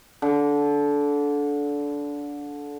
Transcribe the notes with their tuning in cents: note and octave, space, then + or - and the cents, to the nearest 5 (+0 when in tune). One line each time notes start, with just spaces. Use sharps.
D3 -20